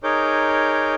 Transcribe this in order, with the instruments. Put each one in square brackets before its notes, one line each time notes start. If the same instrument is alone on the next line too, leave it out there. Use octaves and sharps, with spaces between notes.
[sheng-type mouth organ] D#4 G#4 A#4 C#5 D6 G6